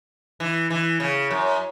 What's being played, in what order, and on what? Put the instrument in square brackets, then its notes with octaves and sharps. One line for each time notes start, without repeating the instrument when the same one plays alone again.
[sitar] E3
E3
C#3
F#2